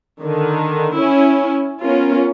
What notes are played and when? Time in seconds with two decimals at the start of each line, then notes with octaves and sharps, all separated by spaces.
0.23 D3 D#3
0.95 C#4 E4
1.81 B3 C#4 F4 A#4